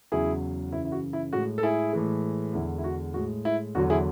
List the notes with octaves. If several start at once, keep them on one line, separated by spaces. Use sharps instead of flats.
E2 C#3 F#3 E4 G#4
F#2 C#3 E3 E4
E4
F#4
E4
A2 G#3 F#4
A4
E4 G#4
A2 E3 G#3
E2 D3 G#3 E4
E4
F#4
A2 G#3 F#4
E4
E2 D3 F#3 F#4
E4 G#4